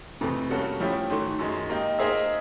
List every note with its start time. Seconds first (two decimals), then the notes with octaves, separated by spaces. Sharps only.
0.21 F2 C3 E3 A3
0.50 G3 A#3 C#4 F#4 A4
0.80 F3 A3 C#4 E4 G4
1.10 G#2 D#3 F#3 A3
1.39 F#2 D#3 G#3
1.69 A#3 D#4 G4
1.99 A#3 D#4 G#4 C5 E5